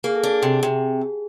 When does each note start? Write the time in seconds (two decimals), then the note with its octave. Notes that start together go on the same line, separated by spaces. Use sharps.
0.04 A#3 G#4
0.15 A4
0.23 D4 G#4
0.43 C3
0.63 C3